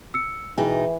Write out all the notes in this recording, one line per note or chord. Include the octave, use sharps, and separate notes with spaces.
E6 C#7
B2 E3 D#4 G#4 G5 G#5